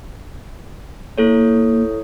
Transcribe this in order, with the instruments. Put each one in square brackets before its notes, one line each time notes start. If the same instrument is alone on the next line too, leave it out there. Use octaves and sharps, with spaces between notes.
[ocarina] A#3 [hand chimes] E4 A4 C#5